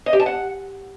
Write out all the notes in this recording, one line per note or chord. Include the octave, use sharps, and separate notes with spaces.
D#5
G4
A5
F#5